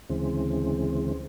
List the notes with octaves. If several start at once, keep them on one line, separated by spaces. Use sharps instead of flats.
D2 C#3 E3 G#3 C4